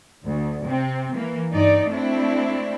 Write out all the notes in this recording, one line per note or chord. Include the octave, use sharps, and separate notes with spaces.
D2
C3 C4
E3 A#3
G2 D#4 D5
A3 C4 D4 E4